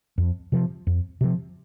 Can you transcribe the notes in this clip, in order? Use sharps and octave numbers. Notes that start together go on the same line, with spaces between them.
F2
C3 F3
F2
C3 F3